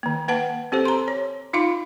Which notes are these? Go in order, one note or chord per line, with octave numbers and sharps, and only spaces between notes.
D#3 A#3
A#3 B4 F#5 A5
C4 G4 A4 C5
A#5 C6
C#5
D#4 F4 F5 C6